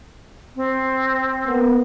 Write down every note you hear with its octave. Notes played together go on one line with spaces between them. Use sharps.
C4
A#3 B3